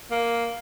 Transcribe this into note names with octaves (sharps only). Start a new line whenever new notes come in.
A#3